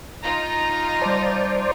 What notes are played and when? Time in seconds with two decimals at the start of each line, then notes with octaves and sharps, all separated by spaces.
0.23 D#4 F4 A#5
1.01 G3 C5 D5 A5